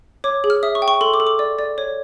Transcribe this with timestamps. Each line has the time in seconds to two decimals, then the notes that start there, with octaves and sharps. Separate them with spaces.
0.24 C#5 D6
0.44 G#4
0.50 F6
0.63 E5 D#6
0.75 C#6
0.82 G5
0.88 C#6
1.01 A4 C6
1.14 D6
1.20 A4
1.27 D6
1.39 D5
1.59 D5
1.78 C#5